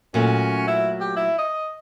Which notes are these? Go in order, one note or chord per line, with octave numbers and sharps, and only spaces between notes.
A#2 F#3 A3 C#4
E4
G4
E4
D#5